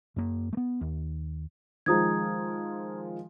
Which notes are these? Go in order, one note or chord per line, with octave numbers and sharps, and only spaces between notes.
F#2 A#3
A3 B3
D#2
D#3 F3 G#3 A#5 D#6 G#6